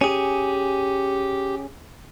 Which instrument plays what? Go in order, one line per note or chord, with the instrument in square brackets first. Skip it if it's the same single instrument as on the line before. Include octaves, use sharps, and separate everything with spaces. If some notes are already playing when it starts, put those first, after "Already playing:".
[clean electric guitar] C#4 G#4 [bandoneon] G4